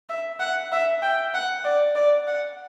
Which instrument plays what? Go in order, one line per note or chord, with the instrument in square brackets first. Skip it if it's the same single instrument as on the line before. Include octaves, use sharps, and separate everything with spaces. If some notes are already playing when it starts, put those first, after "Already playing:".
[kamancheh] E5
F#5
E5
G5
F#5
D5
D5
F#5